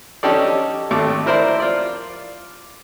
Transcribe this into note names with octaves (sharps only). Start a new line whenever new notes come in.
C#4 D#4 G4 A4 D5
G#1 A3 D6
E4 A#4 C5 D5
F4 D5